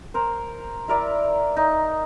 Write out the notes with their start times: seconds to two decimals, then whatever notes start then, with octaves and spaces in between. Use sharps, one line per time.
0.14 A#4 C5
0.88 E4 A#4 D5 E5
1.57 D#4